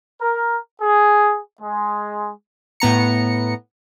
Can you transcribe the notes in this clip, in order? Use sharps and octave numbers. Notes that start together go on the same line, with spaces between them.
A#4
G#4
G#3
A2 B3 A#5 C#7